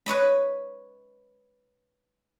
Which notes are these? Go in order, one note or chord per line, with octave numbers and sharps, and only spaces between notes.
B4 C#5 D#5 B5